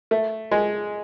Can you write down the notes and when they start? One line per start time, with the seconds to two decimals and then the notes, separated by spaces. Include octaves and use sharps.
0.11 A3
0.51 G#3